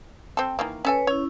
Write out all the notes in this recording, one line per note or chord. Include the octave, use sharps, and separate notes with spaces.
C4 A4
D#3 E3 A#3
C#4 A4 B4 C#5 G#5
C#4 E4 C#5